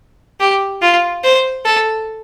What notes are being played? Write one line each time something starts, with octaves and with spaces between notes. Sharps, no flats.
G4
F4
C5
A4